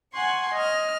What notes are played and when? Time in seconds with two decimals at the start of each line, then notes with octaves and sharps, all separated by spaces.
0.14 F#5 G#5 C6 C#6
0.56 D#5 F6